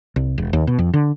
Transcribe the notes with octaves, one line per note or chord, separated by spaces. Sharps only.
C2
E1
D#2
B2
F2
D3